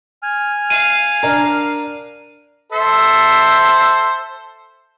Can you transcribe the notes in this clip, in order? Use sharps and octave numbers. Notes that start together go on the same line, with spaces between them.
G#5 F6
F5 D#7
D4 A#4
A4 C5 E5